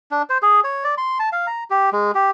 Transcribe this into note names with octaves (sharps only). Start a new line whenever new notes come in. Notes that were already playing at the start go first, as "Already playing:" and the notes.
D4
C5
G#4
C#5
D5
C6
A5
F5
A#5
G4
G#3
G4